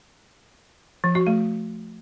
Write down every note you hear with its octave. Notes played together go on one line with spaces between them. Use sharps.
F3
F#4
A3